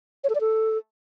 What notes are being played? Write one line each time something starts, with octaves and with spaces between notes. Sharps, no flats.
C#5
A4
D5
A4